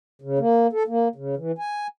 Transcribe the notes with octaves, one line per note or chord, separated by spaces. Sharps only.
C#3
A#3
A4
A#3
C#3
E3
G#5